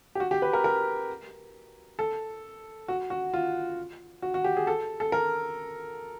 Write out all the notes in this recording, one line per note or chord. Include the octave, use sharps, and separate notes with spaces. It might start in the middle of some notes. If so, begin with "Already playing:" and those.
G4
F#4
G4
B4
A#4
A#4
A4
F#4
F#4
F4
F#4
F#4
G4
G#4
A4
A4
A#4